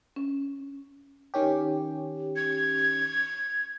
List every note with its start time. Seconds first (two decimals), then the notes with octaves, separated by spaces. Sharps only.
0.16 C#4
1.34 D#3 C#4 G4
2.36 G#6